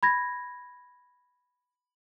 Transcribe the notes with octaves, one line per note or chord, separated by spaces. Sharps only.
B5 G#6 A#6